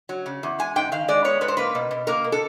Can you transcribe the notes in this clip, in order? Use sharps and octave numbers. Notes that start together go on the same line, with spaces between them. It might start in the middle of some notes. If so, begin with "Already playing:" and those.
F#3
C#3
E2
G#3 G#5
G#2 G5
D#3 F5
G#3 D5
B3 C#5
G#2 B4
C5
A#3 B4
B2
B2
A#3 A#4
B2
A4